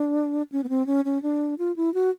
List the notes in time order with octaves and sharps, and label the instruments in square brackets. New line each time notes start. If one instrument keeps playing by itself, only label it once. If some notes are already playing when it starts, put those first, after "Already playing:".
Already playing: [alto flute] D4
C#4
B3
C4
C#4
C#4
D4
F4
E4
F#4